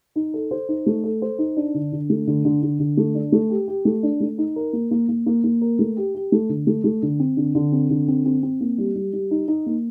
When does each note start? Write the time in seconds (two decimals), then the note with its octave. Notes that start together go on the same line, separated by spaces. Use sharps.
0.16 D#4
0.34 A4
0.51 C5
0.69 D#4
0.86 A3
1.04 A4
1.22 C5
1.38 D#4
1.57 D4
1.74 D3
1.92 D3
2.10 A3
2.27 D3
2.45 D3
2.63 D3
2.79 D3
2.97 A3
3.15 D4
3.32 A3
3.50 G4
3.68 G4
3.85 A3
4.03 D4
4.20 A3
4.38 D#4
4.56 A#4
4.73 A#3
4.91 A#3
5.09 A#3
5.26 A#3
5.44 A#3
5.61 A#4
5.79 A3
5.97 G4
6.15 G4
6.32 A3
6.49 D3
6.67 A3
6.84 A3
7.02 D3
7.20 C4
7.37 D3
7.55 D3
7.72 C4
7.90 D3
8.08 C4
8.25 C4
8.43 C4
8.61 A#3
8.78 G3
8.96 G3
9.13 G3
9.31 D#4
9.48 D#4
9.66 A#3